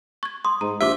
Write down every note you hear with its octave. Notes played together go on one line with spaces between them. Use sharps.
C#6 G#6
C6 D#6
G#2 A#5
A#1 G4 C5 E5 D6